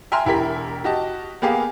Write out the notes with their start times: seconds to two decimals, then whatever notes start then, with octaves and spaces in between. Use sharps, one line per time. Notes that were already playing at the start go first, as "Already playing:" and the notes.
0.12 E5 G5 G#5 A#5 C6 F6
0.25 E1 E4 G4 A#4 B6
0.84 F#4 G4 D#5 A5
1.42 A#3 B3 G4 G#4 F5